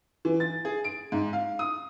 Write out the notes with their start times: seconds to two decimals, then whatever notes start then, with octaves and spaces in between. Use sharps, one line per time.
0.25 E3
0.40 A6
0.65 G#4
0.84 D7
1.12 G#2
1.33 F5
1.59 D#6